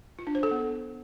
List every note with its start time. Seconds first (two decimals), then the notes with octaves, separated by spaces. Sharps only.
0.19 F4
0.27 D4
0.35 C5
0.43 A4
0.51 B3